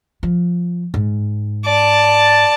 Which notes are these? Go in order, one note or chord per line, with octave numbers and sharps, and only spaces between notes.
F3
G#2
D5 A5